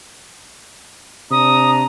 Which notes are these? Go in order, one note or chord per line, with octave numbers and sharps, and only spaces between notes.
C3 D4 A#5 D#6